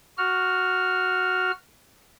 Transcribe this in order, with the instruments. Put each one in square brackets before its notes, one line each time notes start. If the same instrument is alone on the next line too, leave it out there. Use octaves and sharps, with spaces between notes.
[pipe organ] F#4 F6